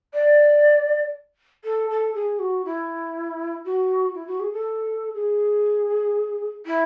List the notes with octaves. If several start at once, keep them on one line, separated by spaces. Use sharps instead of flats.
D5
A4
A4
G#4
F#4
E4
F#4
E4
F#4
G#4
A4
G#4
E4